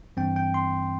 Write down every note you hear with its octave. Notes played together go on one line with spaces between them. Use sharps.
G2 E3 C4 G5
G5
C6